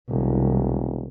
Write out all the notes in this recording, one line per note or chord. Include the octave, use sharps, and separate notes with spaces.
E1 C2